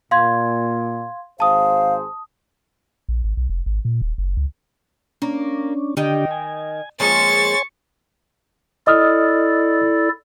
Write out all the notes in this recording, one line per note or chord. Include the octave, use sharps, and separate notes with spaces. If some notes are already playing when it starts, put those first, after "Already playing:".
A#2 F5 C6 G#6
G#1 G#4 C5 F5 A5 D#6
A#1
G#1
B1
F1
G#1
A#2
D#1
F#1
C#2
A#3 C#4 D4
D3 D#3 D4 G4 D#5 G5
G#5
F3 G#3 A#3 C#5 G#5 C6 C#6 A6
E4 A4 D5 D#5 D#6 F6